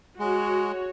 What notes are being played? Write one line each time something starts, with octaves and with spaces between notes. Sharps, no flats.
G#3 F#4 C#5